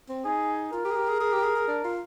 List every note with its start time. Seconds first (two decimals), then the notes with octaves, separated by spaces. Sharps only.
0.09 C4
0.25 D#4 G#4
0.73 F4 A#4
0.85 G4
0.91 G#4
0.96 G4
1.08 G#4
1.20 G#4
1.33 G4
1.43 G#4
1.56 G#4
1.68 D4
1.84 F4